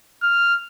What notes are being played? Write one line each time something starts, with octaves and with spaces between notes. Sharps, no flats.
F6